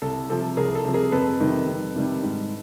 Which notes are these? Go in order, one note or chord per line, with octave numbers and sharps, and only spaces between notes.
C2 A4
C3 F3 A4
C2 G#4 A#4
A4
C3 F3
G#4 A#4
F2 A4 B4
C3 D#3 G3
F2
C3 D#3 G3
G#2